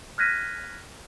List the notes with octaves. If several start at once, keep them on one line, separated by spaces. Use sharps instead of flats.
F6 F#6 G#6 A#6 B6 D#7